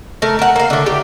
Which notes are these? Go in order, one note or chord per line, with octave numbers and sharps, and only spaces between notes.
A3 A#4
A#4 F#5
A#3 F5
D3 A3
G4